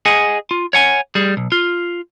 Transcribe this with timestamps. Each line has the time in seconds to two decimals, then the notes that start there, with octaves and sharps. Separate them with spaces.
0.06 G#4 D#5 F#5 G#5
0.51 F4
0.73 C#5 F#5 G#5
1.15 G3 G#4
1.37 B1
1.52 F4